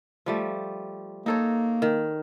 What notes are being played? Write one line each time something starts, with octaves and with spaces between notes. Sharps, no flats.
F3 G3 A3
A#3 D#4 A4 C#5
D#3